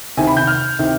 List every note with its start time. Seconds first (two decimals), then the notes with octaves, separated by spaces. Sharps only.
0.17 C3 D#3 G#5
0.27 B5
0.37 G6
0.47 F6
0.79 C3 D#3